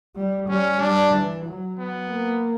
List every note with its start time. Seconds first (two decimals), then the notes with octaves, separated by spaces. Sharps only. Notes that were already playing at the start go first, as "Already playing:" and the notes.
0.16 G3
0.48 G3 C#4
0.81 G3 D4
1.13 E3
1.46 F#3
1.79 B3
2.11 A#3